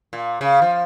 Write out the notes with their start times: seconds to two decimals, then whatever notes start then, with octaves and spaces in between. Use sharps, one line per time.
0.13 A#2
0.41 C#3
0.62 F3